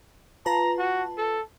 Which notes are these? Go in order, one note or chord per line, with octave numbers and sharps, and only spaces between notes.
F4 B4 A5 A#5
F#4
A4